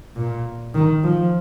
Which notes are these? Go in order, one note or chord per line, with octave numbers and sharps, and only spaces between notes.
A#2
D#3
F3